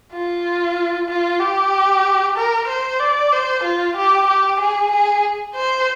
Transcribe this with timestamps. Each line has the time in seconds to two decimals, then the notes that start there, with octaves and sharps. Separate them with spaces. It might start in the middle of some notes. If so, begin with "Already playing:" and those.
0.13 F4
1.09 F4
1.40 G4
2.37 A#4
2.68 C5
3.00 D5
3.32 C5
3.64 F4
3.96 G4
4.27 G4
4.60 G#4
4.91 G#4
5.55 C5